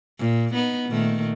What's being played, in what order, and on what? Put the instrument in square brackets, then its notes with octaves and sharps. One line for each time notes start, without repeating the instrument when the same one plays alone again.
[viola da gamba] A#2
B3 D#4
A#2 D#3 A3